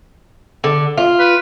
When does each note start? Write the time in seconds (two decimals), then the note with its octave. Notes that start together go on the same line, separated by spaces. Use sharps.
0.64 D3
0.97 F4
1.19 B4